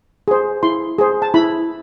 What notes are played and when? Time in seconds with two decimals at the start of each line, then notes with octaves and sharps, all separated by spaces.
0.28 G#4 C5
0.63 E4 C6
0.98 G#4 C5
1.22 A5
1.34 E4 B5